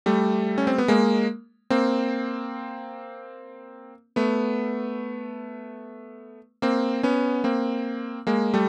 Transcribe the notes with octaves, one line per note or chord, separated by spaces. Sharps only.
G3 A3
C#4
C4
B3
G#3 A#3
A#3 C4
A3 B3
A#3 C4
B3 C#4
A#3 C4
G#3 A#3
G3 A3